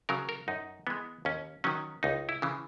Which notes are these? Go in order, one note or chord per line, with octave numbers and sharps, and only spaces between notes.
C#3 F#3 A#4
A#4
F#2 D#4
E3 G#3 B3
D#2 C#4
D#3 F#3 C#4
C#2 D#4
E4
C#3 E3